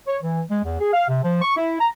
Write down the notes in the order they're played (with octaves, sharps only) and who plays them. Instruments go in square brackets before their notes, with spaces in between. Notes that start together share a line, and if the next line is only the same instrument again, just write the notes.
[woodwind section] C#5
E3
G#3
E2
G#4
F5
C3
F3
C#6
E4
A#5